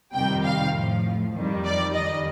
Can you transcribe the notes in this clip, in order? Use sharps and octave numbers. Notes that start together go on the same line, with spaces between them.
F2 C3 D#3 G3 G5
F5
A2 F3
F2 D#3 G3
D5
F2 D#3 G3 D#5